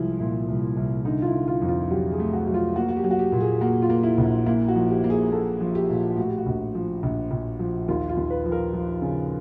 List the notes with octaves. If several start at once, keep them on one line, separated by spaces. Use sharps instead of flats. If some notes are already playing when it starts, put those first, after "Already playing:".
Already playing: C2 F3 G#3 E4
A#2 E4
C2
C2
D3 D#4
F4
E4
D3
F4
F2
F4
F#3 G4
G#4
A3
F#4
F#3
F4
A#3 F#4
F#4
G4
F#3
F#4
G4
A#2
G#4
A#3 F#4
F4
A#3
E4
A#1
A#3 E4
F#4
F3
G4
A#3
G#4
A#3 A4
F3
G4
A#2
A2 F#4
G4
F#4
A#1
F3
A#1
A#1
F3
D#2 F4
F4
D#2
B4
F3
A#4
F3
C#3